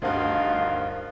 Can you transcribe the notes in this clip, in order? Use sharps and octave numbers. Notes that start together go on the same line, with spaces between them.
D2 G2 D#3 F3 F4